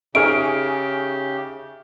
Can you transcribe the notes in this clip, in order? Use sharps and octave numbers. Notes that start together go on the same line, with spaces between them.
C#3 D#4 G4 G#4 E5 C#6 F6 D7